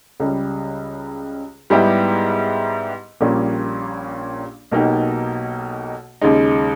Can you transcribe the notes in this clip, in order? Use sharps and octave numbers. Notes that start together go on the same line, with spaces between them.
C#2 C#3 G3
G#2 G3 B3 E4 G4
A#1 A#2 G3 A#3 C#4
B1 B2 A#3 D#4 G4
D#2 C#3 G#3 D#4